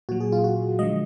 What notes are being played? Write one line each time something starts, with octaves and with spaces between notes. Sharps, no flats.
A#2 F#3 F#4
G#4
F4
F#4
D3 F3 G#3 D#5